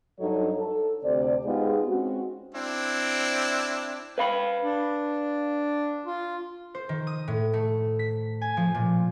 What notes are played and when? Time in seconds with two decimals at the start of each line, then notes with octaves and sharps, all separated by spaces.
0.20 G2 F#3 D4 D#4 A4 C#5
0.57 A4
1.04 D2 C3 C5 D5
1.45 G#3 B3 D#4 F4 G4 G#4
1.88 G#3 C4 C#4 F#4
2.55 C4 D4 E4
4.18 B4 F5 B5
4.63 D4
6.06 F4
6.75 C5
6.89 D#3
7.07 D#6
7.28 A2
7.53 A3
7.99 B6
8.41 G#5
8.57 F3
8.74 A#2